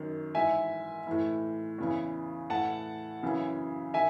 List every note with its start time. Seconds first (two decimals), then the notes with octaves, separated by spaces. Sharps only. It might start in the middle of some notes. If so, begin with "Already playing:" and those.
Already playing: F#2 D#3
0.35 G#2 E3 E5 G#5
1.07 A2 E3
1.79 E2 C#3 E3
2.50 A2 E3 F#5 A5
3.23 F#2 C#3 E3
3.94 D#3 E5 G#5